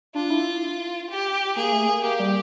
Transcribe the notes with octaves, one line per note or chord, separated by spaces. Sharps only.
D4 F4
E4
G4
A#3 G#4
A3
A#3
A#3 G4
G3